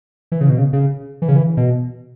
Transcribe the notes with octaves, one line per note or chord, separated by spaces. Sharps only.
E3
C#3
B2
C#3
C#3
E3
C#3
E3
B2